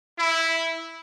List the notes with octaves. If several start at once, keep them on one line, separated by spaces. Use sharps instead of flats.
E4